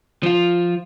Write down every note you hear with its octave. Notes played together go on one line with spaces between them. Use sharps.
F3 F4